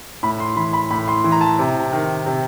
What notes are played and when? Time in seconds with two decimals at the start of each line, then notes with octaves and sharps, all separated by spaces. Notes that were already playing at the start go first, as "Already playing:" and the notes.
0.23 A2 B5
0.40 C6
0.56 E3 B5
0.73 B5
0.91 A2 B5
1.08 C6
1.24 E3
1.32 A#5
1.41 A5
1.59 C3
1.93 D#3
2.26 C3